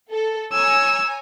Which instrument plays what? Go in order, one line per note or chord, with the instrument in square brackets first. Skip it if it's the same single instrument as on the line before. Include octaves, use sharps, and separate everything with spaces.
[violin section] A4
[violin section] C#5 G#5 A#5 [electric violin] E6